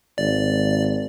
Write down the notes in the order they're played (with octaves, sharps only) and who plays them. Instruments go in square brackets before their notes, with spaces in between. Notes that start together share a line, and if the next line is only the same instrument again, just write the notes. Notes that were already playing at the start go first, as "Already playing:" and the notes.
[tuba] G#1 [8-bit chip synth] D5